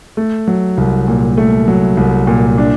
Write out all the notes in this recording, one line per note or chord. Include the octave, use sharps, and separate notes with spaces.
A3
F#3
C2
A#2
A3
F#3
C2
A#2
D4